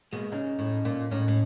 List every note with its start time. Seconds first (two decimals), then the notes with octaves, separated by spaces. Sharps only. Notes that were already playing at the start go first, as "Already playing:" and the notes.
0.13 B2 G#3 A#3
0.32 C#3 C#4 D#4
0.59 A2
0.85 A#2
1.11 A2 C#4 D#4
1.28 A2